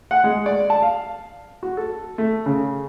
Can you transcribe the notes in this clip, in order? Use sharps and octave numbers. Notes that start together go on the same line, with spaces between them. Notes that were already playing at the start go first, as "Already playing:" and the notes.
F#5
G#3
D5
A5
F5
F#4
A4
A3
C#3